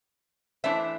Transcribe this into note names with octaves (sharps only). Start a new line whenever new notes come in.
E3 A3 D4 C5 E5